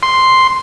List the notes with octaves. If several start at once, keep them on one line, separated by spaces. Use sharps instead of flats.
C6